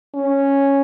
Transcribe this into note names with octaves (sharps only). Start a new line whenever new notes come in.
C#4